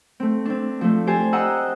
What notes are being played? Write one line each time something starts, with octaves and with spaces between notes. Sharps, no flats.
A3 C4
C4 D4
F3 A3
G4 A4 C5 G#5 A5
D#5 F#5 G5 A#5 D#6 E6